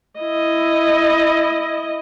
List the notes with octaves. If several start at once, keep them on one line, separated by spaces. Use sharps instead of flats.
E4 D#5